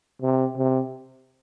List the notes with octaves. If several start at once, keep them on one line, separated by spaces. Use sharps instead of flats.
C3
C3